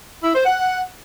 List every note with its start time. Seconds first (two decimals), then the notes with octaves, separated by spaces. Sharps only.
0.23 E4
0.34 C5
0.45 F#5